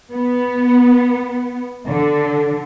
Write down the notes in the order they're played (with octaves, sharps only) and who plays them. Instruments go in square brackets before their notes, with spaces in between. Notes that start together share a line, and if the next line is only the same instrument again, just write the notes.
[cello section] B3
D3